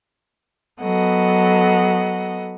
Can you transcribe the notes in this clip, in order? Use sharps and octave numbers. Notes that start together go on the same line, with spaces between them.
F#3 B3 A4 D#5 F#5